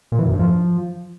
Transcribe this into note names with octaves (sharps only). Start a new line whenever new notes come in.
A#2
E3
F#2
G2
F3